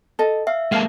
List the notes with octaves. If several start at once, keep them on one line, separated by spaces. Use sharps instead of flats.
A4 D#5
E5 F5
G#3 A#3 F5 A5